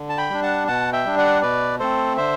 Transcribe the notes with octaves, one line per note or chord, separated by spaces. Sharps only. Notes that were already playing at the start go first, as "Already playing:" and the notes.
Already playing: D3
A5
G5 B5
G3 D4
F#5 A5
B2 F#5 A5
E5 G5
G3 D4
D5 F#5
B2 B4 D5
A3 C4 A4 C5
D3 C5 E5